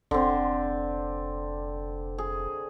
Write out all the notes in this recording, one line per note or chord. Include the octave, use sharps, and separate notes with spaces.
F1 D3 C4
G#4